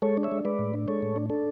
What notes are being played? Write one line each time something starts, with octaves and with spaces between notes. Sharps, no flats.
G#3 A4 C#5
D4
C#5 E5
G#3
G#3 B4 D5
A2
D4
G#3 A4 C#5
A2
D4
D4 A4